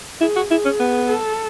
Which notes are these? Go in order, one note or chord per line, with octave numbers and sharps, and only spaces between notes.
E4 G#4
F#4
E4 G#4
C#4
B3
A4